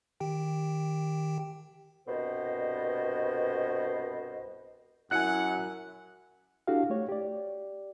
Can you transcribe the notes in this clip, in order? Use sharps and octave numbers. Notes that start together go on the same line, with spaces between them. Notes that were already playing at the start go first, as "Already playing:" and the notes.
D#3 G4 G5
C2 G2 B2 C5 D#5
F#2 F#3 E4 F#5 G#5 F#6 C#7
D4 E4 F#4 G4 A4 F5
A3 G4 C#5
G4 D5